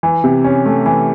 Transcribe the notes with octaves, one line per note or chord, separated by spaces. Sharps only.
E3
C3
C#4
A3
E3